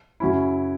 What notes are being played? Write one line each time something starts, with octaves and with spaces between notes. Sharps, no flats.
F#2 C#3 F#3 C#4 E4